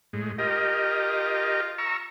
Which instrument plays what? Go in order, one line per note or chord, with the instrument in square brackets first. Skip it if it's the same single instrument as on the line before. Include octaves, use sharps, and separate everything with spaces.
[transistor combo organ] A2 G#3
[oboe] F4 [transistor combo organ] G4 A#4 D#5
[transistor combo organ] A#5 C#6 E6